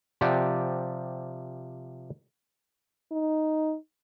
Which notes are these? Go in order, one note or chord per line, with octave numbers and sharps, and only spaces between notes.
C3 F3 G4 D5 F#5
D#4